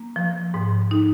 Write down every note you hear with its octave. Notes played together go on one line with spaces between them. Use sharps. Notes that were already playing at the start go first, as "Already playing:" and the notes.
Already playing: A#3
F3
G#2
D#4